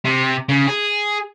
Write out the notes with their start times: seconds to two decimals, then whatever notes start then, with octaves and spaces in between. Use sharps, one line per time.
0.05 C3
0.49 C#3
0.67 G#4